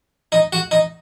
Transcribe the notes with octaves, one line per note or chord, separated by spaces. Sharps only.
D#4
F#4
D#4